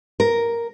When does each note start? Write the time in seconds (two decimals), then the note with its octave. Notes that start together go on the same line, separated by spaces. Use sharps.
0.20 A#4